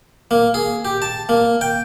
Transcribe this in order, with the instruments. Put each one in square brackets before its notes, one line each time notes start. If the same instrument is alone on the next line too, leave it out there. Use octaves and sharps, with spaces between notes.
[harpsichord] A#3
G#4
G4
A5
A#3
G5